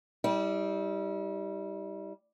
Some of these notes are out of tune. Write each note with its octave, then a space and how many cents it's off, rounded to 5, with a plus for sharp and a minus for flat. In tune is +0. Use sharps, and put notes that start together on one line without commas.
G3 +0 E4 -40